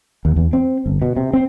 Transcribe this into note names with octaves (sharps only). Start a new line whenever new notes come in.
D#2
E2
C4
G1
B2
C3
C4